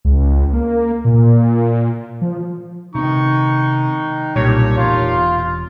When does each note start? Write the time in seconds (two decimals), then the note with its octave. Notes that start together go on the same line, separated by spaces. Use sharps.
0.05 C#2
0.53 A#3
1.05 A#2
2.22 F3
2.95 C3 D#3 G#3 B3 D#4 C#6
4.36 B1 A#2 G3 D4 D#4 G4 C#5
4.77 E1 F4